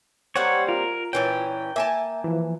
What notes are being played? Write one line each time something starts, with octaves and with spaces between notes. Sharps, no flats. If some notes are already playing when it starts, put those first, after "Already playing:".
G3 A#3 C4 C#5 F#5
F4 A#4
A#2 E3 C#4 G5
A#3 E5 G#5 A5
E3 F3